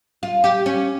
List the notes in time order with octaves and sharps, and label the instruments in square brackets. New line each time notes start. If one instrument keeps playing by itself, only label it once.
[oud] F4
G4
C#4